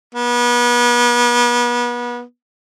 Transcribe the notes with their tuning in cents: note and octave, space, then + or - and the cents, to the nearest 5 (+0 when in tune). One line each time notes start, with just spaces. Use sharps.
B3 -35